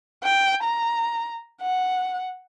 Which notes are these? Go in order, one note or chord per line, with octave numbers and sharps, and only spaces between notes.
G5
A#5
F#5